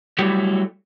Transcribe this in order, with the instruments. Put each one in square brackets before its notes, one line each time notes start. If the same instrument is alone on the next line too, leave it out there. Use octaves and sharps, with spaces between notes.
[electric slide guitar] F#3 G3 A3 E4 G4